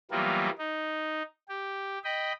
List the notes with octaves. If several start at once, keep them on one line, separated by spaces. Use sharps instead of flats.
E3 F#3 G3 A#3 B3 F4
D#4
G4
D#5 G5 B5